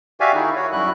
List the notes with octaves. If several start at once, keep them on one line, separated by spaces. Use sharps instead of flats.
F#4 G4 D5 E5 F5 G#5
D#3 D#4 E4 G#4
F#4 C#5
F#2 G3 E4 F#4 F#6